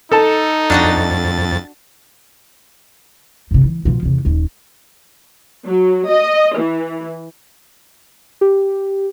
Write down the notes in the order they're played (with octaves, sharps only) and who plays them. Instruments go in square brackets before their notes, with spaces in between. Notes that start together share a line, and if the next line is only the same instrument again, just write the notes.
[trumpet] D#4 [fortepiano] A4 A5
[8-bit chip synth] F2 A6 [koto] D4 F#4 D#5
[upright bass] G2 C3
E3
B2 F3
E2 C3
D#1 D#2
[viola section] F#3
D#5
E3
[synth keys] G4